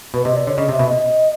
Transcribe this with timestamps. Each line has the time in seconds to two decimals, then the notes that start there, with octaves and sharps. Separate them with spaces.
0.14 B2 B4
0.25 C3 D#5
0.36 D5
0.47 D3 C#5
0.57 C#3 D#5
0.69 C3 E5
0.79 B2
0.87 D#5